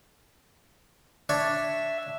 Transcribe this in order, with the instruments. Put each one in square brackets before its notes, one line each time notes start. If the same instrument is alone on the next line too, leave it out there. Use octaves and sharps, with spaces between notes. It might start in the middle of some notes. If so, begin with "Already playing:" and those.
[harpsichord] D4 C#5 [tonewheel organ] E5